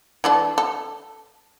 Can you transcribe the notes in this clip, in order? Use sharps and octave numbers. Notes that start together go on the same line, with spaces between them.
E3 D4 A4
A4